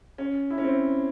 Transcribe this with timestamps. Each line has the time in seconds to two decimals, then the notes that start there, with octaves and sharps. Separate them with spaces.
0.18 C#4
0.50 E4
0.58 C#4
0.64 C4